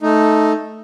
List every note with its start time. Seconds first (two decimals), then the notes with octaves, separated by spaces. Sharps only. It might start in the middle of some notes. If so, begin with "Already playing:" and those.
0.01 A3 D#4